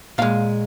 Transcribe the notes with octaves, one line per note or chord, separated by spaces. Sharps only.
A#2 G#3 F5